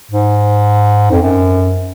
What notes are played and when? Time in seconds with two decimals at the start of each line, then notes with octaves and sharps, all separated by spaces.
0.12 G#2
1.11 F2
1.22 F#2